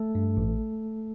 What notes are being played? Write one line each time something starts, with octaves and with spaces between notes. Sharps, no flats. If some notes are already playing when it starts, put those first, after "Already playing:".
Already playing: A3 A4
G2
A1